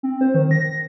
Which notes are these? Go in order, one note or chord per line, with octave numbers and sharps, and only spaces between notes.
C4
C5
D#3
A#6